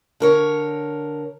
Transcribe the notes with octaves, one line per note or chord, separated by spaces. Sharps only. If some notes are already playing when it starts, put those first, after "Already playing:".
D3 A#4 C#5